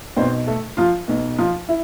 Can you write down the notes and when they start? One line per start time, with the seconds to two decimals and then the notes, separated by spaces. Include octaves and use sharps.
0.16 B1 B2 C4 C5
0.47 A3 A4
0.77 F3 F4
1.08 B1 B2
1.38 F3 F4
1.69 E4